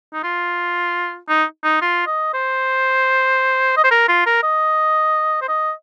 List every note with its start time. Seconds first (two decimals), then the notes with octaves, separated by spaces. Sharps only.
0.13 D#4
0.23 F4
1.29 D#4
1.64 D#4
1.81 F4
2.07 D#5
2.33 C5
3.77 D#5
3.84 C5
3.91 A#4
4.08 F4
4.26 A#4
4.43 D#5
5.41 C5
5.48 D#5